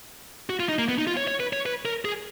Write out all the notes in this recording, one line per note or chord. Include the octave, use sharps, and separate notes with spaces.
F#4
F4
D#4
A#3
B3
D#4
F4
C#5
C#5
B4
C#5
B4
A#4
G#4